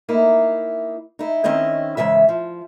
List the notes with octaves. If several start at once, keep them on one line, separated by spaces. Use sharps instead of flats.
A#3 D#4 E4
D#4 E4
D#3 C4 C#4 E4 D#5
G#2 C#3 E3 E5
F3